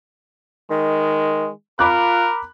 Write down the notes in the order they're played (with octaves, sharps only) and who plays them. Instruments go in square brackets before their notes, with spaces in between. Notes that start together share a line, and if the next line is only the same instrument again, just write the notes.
[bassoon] D#3 [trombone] G#3
[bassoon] F4 [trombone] A#4 [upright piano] B5 D6 F#6